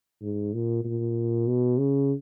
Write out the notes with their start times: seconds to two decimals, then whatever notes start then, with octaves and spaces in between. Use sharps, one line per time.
0.21 G#2
0.53 A#2
0.84 A#2
1.47 B2
1.79 C#3